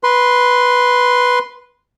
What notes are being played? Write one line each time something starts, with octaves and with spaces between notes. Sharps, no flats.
B4 C6